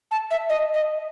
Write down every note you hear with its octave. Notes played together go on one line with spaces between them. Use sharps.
A5
E5
D#5
D#5